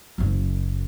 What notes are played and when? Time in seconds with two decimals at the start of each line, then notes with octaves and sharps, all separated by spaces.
0.18 F#1 F#2